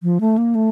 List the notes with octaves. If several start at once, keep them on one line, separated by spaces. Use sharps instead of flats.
F3
A3
A#3
A3